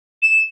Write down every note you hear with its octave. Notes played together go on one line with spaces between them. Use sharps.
E7